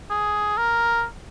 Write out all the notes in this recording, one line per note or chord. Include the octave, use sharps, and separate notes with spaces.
G#4
A#4